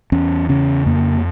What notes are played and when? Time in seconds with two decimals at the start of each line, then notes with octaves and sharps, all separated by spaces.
0.12 E2 C#4
0.49 C#3 C#4
0.86 F2 A#3